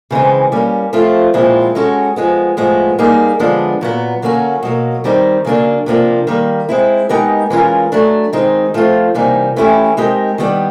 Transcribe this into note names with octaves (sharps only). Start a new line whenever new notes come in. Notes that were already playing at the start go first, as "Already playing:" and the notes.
C#3 E3 G#3 C4
G3 A#3 C#4
F3 A3 C4 F4
A#2 F3 G#3 C4 E4
G#3 C#4 F#4 A4
F3 G#3 B3
A2 F3 G#3 B3
G3 A#3 D#4 G#4
D3 F3 G#3 B3 D4
A#2 F#3 B3
D3 F#3 A#3 C#4 F#4
B2 F#3 A#3
D#3 G3 C4 D#4
C#3 F#3 A#3 D4
C3 F3 A#3 D4
D#3 G3 A#3
G#3 C4 E4
G#3 B3 D#4 G4 A#4
E3 G#3 C#4 F4 A#4
F#3 A3 D4
D#3 G#3 C4 D#4
F3 A3 C4 F4
C3 E3 G3 A#3 D#4
E3 A3 C#4 E4 G4
G#3 C4 D#4 G4 A#4
D#3 G3 B3 D4 G4